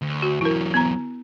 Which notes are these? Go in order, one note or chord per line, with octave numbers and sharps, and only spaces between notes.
D2
F#4
E2 F#3 E4 A#4
B3 A#5